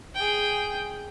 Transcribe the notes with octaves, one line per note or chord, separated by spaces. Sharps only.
G#4 G5